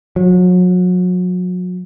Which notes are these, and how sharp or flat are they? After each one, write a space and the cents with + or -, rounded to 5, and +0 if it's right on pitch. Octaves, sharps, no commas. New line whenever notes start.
F#3 -35